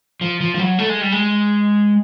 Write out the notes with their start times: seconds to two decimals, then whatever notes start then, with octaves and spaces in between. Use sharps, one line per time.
0.21 F3
0.41 F3
0.55 F3
0.59 F#3
0.79 A3
0.89 G#3
1.01 G3
1.12 G#3